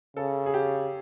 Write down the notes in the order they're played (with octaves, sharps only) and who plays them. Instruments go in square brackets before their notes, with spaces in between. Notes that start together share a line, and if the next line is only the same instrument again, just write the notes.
[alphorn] C#3 [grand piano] A4
[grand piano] G#4
G4